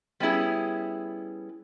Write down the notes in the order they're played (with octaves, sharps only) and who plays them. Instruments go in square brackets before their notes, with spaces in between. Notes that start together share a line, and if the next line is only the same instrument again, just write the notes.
[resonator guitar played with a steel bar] G3 B3 C#4 E4 G#4